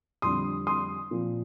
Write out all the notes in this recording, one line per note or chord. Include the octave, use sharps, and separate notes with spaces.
F2 D3 G3 C6 D#6
C6 D#6
A#2 F3 C4